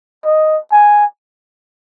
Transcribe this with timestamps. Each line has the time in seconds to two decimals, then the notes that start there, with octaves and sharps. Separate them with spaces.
0.25 D#5
0.72 G#5